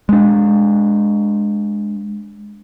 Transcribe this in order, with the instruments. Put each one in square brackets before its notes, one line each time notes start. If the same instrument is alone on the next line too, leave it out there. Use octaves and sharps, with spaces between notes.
[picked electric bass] G#3 D4